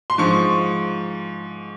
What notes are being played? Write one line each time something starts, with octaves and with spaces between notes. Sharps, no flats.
C6
G#2 F3 C#6